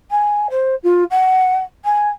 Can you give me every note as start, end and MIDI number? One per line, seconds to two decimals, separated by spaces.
0.11 0.48 80
0.50 0.75 72
0.83 1.04 65
1.11 1.59 78
1.85 2.09 80